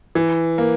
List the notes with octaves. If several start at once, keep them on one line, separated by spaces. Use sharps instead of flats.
E3
A#3